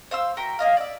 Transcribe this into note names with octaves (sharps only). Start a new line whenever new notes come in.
C5 F5 C6 E6
F#4 A#4 E5 G5
A#3 D#5 F5
D5 E5